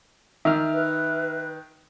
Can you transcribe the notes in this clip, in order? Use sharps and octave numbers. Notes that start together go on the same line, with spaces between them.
D#3 E5 F6
B4